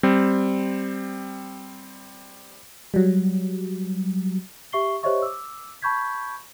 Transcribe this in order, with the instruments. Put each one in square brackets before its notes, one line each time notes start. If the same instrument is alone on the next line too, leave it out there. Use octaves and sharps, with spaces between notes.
[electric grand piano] G3 C4
[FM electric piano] F#3 G3
[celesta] G4 E5 C#6 C7 G7
G4 C5 C#5 D#5 E5 C#6
D6 E6
A5 B5 C#6 G6 G#6 B6